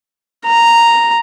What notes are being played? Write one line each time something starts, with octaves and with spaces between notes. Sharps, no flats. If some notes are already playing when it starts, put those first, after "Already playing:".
A#5